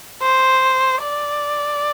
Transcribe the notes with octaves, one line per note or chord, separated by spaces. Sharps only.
C5
D5